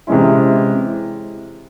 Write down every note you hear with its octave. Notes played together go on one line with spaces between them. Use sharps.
C3 E3 G#3 C#4 E4